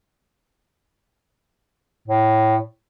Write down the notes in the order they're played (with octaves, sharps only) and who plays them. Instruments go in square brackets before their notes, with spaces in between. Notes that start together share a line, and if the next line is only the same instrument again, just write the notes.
[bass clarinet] A2